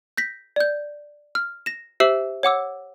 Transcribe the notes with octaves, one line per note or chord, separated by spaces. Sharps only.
G6 A#6 B6
D5 G6
F6
A#6 E7
G4 C5 E5 E6 C7 F#7
C#5 F#5 D6 E6